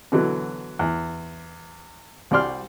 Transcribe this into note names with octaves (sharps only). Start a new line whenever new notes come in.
B2 D3 E3 F#3
E2
C2 G3 F#4 D5 C6 F6